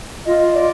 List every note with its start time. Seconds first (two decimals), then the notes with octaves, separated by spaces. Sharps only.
0.24 F4 D#5
0.53 D5